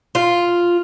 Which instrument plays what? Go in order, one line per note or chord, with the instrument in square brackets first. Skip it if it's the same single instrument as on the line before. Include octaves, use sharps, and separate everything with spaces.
[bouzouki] F4